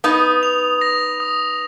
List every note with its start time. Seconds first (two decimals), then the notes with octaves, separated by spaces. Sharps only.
0.04 B3 D#4 D#6
0.43 F7
0.81 A#6
1.20 D#6